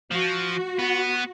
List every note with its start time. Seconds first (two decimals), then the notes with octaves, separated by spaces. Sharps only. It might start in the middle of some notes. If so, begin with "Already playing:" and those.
0.11 F3 F#4
0.79 B3